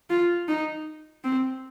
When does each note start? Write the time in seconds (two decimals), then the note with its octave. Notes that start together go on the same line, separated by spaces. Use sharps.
0.10 F4
0.48 D#4
1.24 C4